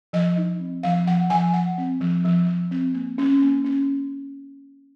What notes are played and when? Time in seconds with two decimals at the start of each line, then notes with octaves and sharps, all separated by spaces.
0.13 F3 D#5
0.37 D#4
0.60 C4
0.83 F3 F5
1.07 F3 F#5
1.30 F3 G#5
1.54 F3 F#5
1.78 C4
2.01 F3
2.24 F3
2.48 F3
2.71 C4
2.94 A#3
3.18 C#4
3.42 A#3
3.65 C#4